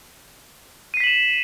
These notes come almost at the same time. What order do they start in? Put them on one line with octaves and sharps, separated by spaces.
D#7 C7 B6 F#7 E7